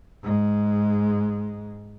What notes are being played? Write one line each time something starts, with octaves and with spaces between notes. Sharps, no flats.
G#2 G#3